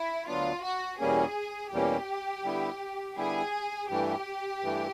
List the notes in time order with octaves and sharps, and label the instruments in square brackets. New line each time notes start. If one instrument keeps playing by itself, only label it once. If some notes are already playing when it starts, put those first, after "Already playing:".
Already playing: [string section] E4
[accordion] D2 D3 F#3 B3 D4 [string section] F4
[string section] F#4
[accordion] E2 B2 G3 A#3 C#4 [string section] G#4
[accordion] E2 B2 G3 A#3 C#4 [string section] G4
[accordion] D3 G3 B3 E4
[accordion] D3 G3 B3 E4 [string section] G#4
[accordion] G2 E3 A3 [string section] G4
[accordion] G2 E3 A3